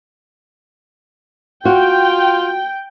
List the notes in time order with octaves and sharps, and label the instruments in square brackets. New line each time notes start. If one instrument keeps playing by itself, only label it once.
[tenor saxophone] F4 [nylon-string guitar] F#4 [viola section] G5